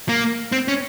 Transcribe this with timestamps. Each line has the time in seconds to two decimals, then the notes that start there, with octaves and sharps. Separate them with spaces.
0.09 A#3
0.52 C4
0.68 C#4